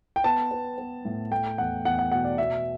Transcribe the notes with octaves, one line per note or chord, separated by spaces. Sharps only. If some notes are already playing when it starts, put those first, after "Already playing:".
G5
B3 A5
B3
B3
A2
A3 G5
E2 F#5
E2 F#5
F#5
B2 F#5
D5
B2 E5